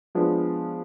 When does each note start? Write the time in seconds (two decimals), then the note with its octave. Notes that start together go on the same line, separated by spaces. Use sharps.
0.15 F3 G#3 B3 D4